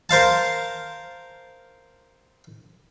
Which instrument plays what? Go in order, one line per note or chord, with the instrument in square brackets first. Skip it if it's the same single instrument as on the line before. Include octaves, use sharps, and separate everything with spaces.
[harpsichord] A#4 C5 F5 A5